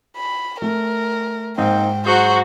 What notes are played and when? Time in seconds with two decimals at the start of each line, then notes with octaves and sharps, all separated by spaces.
0.17 B5
0.62 A3 A#4
1.58 G#2 A#3 C4 D#4 G5
2.07 F#3 F#4 G#4 C5 G6